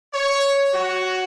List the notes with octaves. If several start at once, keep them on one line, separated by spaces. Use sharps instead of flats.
C#5
F#4